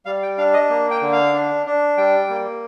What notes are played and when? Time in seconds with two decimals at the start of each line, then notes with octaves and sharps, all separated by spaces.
0.06 G3 F5
0.23 G5
0.38 D4 F5
0.53 D#5
0.70 A#3
0.91 G5
1.02 D3
1.12 F5
1.34 D4
1.66 D4
1.97 G3 G5
2.30 A#3